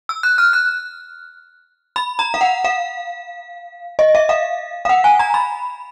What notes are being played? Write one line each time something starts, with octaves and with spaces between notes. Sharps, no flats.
E6
F#6
F6
F#6
B5
A#5
F5
F#5
F5
D#5
E5
F5
F5
F#5
G#5
A#5
B5